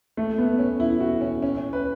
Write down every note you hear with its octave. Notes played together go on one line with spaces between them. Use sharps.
A3
B3
C#4
E4
F#4
C#4
C#4
C#4
B4